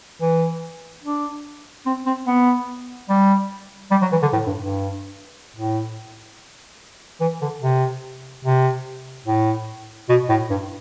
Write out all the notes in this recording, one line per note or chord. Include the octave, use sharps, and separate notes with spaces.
E3
D4
C4
C4
B3
G3
G3
F#3
E3
D3
A2
G2
G2
A2
E3
D3
C3
C3
A2
B2
A2
G2